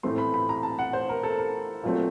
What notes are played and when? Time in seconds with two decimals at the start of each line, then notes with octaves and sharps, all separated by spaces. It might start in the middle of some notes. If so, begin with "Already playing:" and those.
0.03 A2 E3 A3 C4 C6
0.18 B5
0.34 B5
0.49 A#5
0.63 A5
0.79 F#5
0.93 C5
1.09 A#4
1.23 A4
1.38 A#4
1.83 A#2 F#3 A3 C4